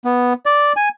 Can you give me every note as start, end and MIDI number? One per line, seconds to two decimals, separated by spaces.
0.05 0.33 59
0.46 0.73 74
0.76 0.89 80